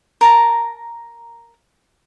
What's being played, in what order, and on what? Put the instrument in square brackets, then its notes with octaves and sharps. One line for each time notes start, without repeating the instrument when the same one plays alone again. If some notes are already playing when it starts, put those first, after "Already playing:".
[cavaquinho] A#4 A5 A#5